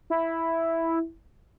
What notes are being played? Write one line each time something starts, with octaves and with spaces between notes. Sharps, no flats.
E4